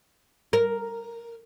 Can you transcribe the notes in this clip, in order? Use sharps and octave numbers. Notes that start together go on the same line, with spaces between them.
A#4